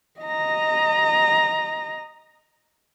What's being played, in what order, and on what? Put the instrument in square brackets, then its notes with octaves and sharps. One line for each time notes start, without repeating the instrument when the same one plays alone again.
[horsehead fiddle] D#5 A#5